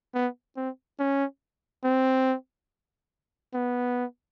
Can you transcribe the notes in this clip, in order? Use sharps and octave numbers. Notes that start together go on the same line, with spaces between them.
B3
C4
C#4
C4
B3